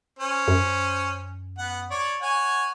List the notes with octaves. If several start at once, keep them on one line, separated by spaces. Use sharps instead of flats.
C#4 C5
F#2
B3 F#5
C#5 D5
C#5 F#5 G#5